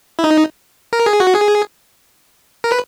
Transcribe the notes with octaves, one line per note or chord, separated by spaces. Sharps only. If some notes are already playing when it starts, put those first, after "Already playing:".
E4
D#4
A#4
G#4
F#4
G#4
A#4
B4